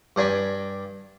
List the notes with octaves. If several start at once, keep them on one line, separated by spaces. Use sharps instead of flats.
G2 D4 G#5 B5 D6